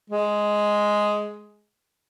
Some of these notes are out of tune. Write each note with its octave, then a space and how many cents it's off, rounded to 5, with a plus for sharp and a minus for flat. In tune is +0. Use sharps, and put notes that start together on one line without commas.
G#3 +5